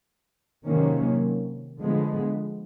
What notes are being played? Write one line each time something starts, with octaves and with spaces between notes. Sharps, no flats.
C3 D#3 F#3 A#3 C#4
D3 F3 G#3 B3